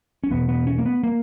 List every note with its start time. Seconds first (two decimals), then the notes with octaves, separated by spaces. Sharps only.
0.24 C#4
0.31 E2 B2 B3
0.49 B3
0.67 C#4
0.78 A#3
0.85 B3
1.04 A#3